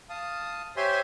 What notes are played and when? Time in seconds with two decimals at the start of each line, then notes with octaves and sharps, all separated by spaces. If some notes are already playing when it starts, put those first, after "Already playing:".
0.10 F5 A5 D#6
0.77 G4 C5 C#5 E5 G#5 C6